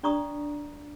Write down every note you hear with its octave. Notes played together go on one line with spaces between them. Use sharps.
D4 D5 A#5 C#6 D#6